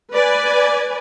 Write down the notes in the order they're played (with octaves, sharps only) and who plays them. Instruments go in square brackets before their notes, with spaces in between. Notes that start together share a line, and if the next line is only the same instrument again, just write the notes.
[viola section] B4 D5 G#5